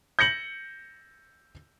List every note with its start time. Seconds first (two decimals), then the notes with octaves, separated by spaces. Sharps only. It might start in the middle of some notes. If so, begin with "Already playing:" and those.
0.19 G6 A#6 C#7 F#7